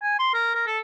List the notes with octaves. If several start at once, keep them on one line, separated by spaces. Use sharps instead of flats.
G#5
C6
A#4
A#4
A4